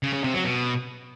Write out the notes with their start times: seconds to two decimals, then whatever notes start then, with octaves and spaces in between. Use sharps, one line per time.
0.03 C#3
0.13 C#3
0.24 C3
0.34 F#3
0.45 B2